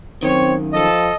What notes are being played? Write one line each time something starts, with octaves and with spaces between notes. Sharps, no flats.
F#2 D#3 C4 C#5
F3 A4 D#5